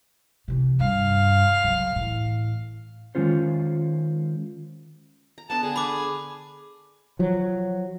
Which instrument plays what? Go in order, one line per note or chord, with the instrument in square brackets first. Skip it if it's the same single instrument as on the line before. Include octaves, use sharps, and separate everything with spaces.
[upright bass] C3 E3
[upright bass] G2 [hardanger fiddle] F5
[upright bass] C#3 F#3
A2 E3
[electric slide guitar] D#3 G#3 C#4 F4 C5
[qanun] A#5
[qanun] B3 D4 A4 [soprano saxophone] A5
[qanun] D3 [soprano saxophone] G#4
[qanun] D4 B4 [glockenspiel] B5 D6
[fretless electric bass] F3 F#3